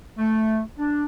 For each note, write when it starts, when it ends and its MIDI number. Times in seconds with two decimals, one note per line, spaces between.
0.18 0.60 57
0.78 1.05 62